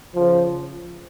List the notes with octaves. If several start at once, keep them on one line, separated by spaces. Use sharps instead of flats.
C#3 F3